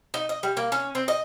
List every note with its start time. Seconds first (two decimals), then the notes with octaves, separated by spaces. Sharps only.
0.14 D#4
0.29 D#5
0.43 G3
0.57 A#3
0.72 C#4
0.95 C4
1.08 D#5